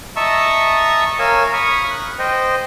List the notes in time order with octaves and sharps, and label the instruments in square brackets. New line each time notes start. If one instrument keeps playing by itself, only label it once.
[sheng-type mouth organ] D#5 E5 A5 A#5 C#6 E6
A#4 C#5 F5 G#5 E6
B5 C#6 D#6 F6
F#6
C5 D#5 G5